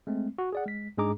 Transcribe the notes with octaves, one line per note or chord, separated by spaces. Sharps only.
G#3 A3 C4
F#4
G#4 D5 F#5
G#3 B6
G#2 G#3 D4 G#4 A#5 D6